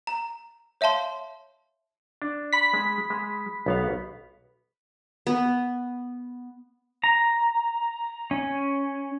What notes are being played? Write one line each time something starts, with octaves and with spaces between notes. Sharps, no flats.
A#5
C#5 E5 F5 A5 C6
D4
B5 B6
G#3
G#3
B1 B3 F5
B3
A#5
C#4